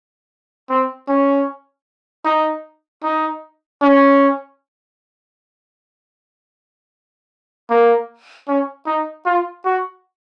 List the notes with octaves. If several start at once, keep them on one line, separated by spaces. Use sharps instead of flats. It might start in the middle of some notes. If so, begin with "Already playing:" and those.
C4
C#4
D#4
D#4
C#4
A#3
C#4
D#4
F4
F#4